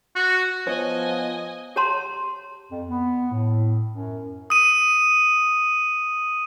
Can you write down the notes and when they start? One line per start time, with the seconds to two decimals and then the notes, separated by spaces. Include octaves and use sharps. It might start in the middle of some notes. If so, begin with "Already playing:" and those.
0.15 F#4
0.67 F3 B3 C#5 D#5 G#5
1.76 G4 C#5 F#5 A5 A#5 C6
2.71 F2
2.89 B3
3.32 A2
3.94 F#2
4.50 D#6 D#7